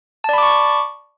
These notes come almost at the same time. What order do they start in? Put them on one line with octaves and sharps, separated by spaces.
A5 D5 B5 D6 C#6